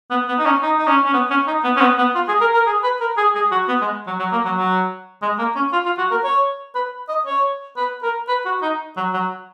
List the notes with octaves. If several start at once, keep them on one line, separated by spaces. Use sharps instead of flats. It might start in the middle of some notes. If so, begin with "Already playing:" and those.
B3
B3
D#4
C#4
D#4
D#4
C#4
C#4
B3
C#4
D#4
B3
C#4
B3
B3
F4
G#4
A#4
A#4
G#4
B4
A#4
G#4
G#4
F#4
B3
G#3
F#3
F#3
A#3
F#3
F#3
G#3
A#3
C#4
F4
F4
F#4
A#4
C#5
B4
D#5
C#5
B4
A#4
B4
F#4
D#4
F#3
F#3